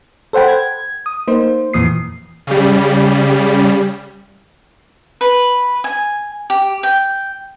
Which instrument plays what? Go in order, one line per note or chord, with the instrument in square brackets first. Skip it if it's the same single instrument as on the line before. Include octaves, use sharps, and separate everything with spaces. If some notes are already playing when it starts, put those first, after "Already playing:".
[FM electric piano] A4 C5 F#5 G5 B5
G#6
D#6
A#3 D#4 C5
F2 A#2 E3 D#6 C7
[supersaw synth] C#3 G3
[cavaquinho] B4
G#5
G4
G5